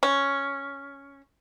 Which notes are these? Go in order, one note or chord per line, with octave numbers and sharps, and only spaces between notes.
C#4